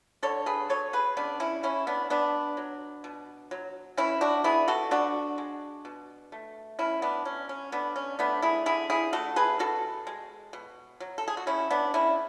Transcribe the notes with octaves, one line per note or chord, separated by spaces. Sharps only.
D3 A4 C#5
G#4 B4
F#3 A4 C#5
G#4 B4
C#3 B3 D4
C#4 E4
G#3 C#4 E4
B3 D4
B2 B3 D4
F#3
B2
F#3
E3 C#4 E4
D4 F#4
B3 E4 G#4
F#4 A4
D3 D4 F#4
G#3
B2
A3
B2 C#4 E4
B3 D4
F#3 C#4
C#4
D3 B3 D4
C#4
A3 B3 D4
E4 G#4
D3 E4 G#4
E4 G#4
A3 F#4 A4
G#4 B4
B2 F#4 A4
G#3
B2
F#3
A4
G#4
F#4
C#3 C#4 E4
B3 D4
G#3 C#4 E4